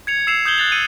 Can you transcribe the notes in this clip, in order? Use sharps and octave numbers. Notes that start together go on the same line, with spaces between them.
G#6 C#7 F7
E6 C7 E7 F7
D#6 G6 G#6 F#7 G7
F#6 A6 F7
E6 C#7 D#7